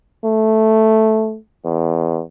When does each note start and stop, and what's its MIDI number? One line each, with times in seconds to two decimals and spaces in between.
0.24 1.37 57
1.65 2.22 40